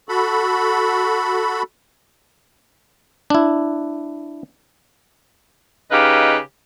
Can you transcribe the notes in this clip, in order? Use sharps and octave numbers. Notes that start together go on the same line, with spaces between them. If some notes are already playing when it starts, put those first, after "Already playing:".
F#4 A4 B5
D4 E4
C#3 D#4 G4 B4 D#5 F5